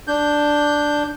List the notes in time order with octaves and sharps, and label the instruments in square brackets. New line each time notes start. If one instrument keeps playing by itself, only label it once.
[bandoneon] D4 G6